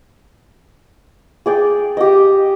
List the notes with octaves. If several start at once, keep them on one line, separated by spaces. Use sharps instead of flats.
G#4 D5 G5
G4 D#5